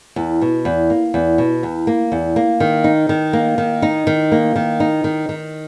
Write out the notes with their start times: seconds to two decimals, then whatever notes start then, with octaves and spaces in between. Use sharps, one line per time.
0.16 E2
0.42 B2
0.65 E2
0.90 A#3
1.14 E2
1.38 B2
1.63 E2
1.87 A#3
2.12 E2
2.36 A#3
2.60 D#3
2.84 D#4
3.09 D#3
3.33 A#3
3.58 D#3
3.82 D#4
4.07 D#3
4.32 A#3
4.56 D#3
4.80 D#4
5.04 D#3
5.29 D#3